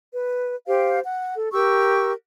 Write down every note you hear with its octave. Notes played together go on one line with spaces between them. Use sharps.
B4
G4 C5 F5
F#5
A4
G4 A#4 C#6 E6